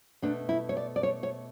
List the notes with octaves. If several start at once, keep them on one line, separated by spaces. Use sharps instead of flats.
B2 A3 D4
E4
C#5
D5
D5
C#5
C#5